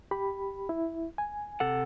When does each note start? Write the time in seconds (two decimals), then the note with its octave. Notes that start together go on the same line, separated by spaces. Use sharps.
0.11 G4 B5
0.69 E4
1.18 G#5
1.60 C3 A4 F#5